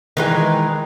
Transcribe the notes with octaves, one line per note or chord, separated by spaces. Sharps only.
D#3 E3 G#3